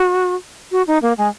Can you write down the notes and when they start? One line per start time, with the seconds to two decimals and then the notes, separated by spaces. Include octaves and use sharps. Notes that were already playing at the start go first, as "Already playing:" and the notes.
Already playing: F#4
0.72 F#4
0.87 D#4
1.02 A#3
1.17 G#3